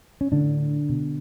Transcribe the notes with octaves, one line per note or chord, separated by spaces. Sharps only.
C#4
A2 D3 D4
B2